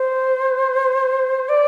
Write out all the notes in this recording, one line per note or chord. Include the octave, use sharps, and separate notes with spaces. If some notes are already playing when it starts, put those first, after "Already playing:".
Already playing: C5
D5